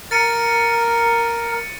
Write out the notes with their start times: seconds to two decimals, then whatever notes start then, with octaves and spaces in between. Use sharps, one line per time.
0.11 A#4 A6 C#7 D#7